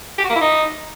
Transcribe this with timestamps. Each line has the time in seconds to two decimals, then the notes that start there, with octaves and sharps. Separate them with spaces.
0.18 G4
0.24 F#4
0.30 A#3
0.36 E4
0.42 D#4